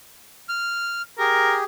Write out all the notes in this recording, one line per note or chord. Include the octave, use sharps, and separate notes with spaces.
F6
G4 G#4 A#4